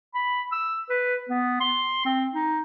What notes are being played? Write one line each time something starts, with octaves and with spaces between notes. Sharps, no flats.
B5
E6
B4
B3
C6
C4
D#4